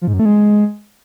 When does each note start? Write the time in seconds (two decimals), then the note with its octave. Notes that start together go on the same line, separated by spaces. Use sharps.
0.01 F3
0.07 G#2
0.13 F#2
0.19 A3
0.25 G#3